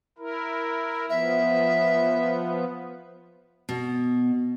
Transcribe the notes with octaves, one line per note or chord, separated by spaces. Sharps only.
E4 A#4
F3 B3 E5
B2